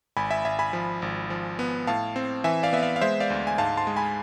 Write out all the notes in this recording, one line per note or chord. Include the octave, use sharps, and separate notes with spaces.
G#1 G#5 B5
E5 G#5
G#1 E5 G#5
G#5 B5
F3
G#1
F3
B3
A2 F5 A5
C4
E3 E5 G#5
D5 F5
B3 E5
D5 F5
F5
G#3 C5 E5
D5 F5
D2
G#5
G#2 F5 A5
A5 C6
G#3
G#5 B5